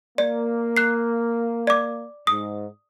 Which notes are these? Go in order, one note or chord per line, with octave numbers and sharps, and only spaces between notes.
A#3 D5
F#6 C7
D5 D6
G#2 D#6